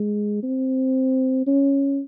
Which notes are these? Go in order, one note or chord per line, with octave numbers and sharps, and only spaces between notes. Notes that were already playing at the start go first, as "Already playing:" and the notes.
Already playing: G#3
C4
C#4